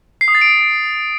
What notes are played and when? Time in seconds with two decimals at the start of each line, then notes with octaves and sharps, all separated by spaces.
0.21 C7
0.28 D#6
0.35 A6
0.41 D7